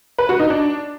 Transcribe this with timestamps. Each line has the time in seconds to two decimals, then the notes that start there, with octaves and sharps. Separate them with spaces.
0.18 B4
0.29 F#4
0.40 D#4
0.50 D4